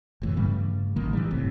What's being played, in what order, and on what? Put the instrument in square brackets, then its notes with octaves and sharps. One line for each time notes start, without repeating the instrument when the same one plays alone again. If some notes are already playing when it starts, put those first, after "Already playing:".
[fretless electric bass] F1 A2 E3
G2 C#3 G3 A3
A1 D#3 A#3
E3 G3
F#1 A2 C3